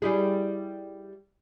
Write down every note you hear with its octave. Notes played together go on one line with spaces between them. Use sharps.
G3 E4 G#4